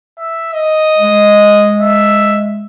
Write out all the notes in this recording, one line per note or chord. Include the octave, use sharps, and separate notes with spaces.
E5
D#5
G#3
E5